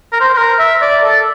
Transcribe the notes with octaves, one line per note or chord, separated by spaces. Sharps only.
A#4
C5
C5
A#4
E5
D5
A4